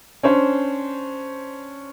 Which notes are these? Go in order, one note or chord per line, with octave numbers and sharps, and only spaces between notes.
C#4 D4 C5